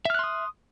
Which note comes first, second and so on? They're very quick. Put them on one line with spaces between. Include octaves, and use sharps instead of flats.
E5 F6 F#6 C6 D#6